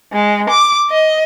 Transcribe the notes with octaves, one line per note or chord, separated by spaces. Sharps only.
G#3
D6
D#5